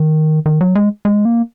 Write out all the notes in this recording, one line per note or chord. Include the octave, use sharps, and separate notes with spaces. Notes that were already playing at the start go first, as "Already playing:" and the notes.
Already playing: D#3
D#3
F#3
G#3
G#3
A#3